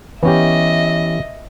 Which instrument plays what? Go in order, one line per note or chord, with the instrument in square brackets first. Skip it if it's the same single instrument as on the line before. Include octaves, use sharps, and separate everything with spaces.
[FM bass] E3 [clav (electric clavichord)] B3 C#4 G4 [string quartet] D#5 E5